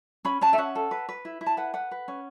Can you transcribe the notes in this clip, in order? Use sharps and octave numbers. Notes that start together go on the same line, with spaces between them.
C#4 B5
C#4 A5
E5
C#4 F#5
A4
B4
B4
E4
E4
A5
B4 F#5
B4 F#5
B4
C#4